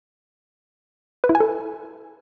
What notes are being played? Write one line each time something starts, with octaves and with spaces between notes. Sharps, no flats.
B4
E4
G#5
A4